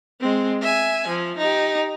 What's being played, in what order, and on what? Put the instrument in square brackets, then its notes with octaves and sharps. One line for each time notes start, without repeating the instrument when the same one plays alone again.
[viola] G#3 C4
E5 G#5
F3
D#4 G4